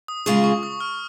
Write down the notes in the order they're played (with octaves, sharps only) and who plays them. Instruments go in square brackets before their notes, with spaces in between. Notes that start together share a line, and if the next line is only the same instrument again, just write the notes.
[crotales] D#6
[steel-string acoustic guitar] C#3 G#3 F4 G#4 [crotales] C#6
[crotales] C#6
D#6
F6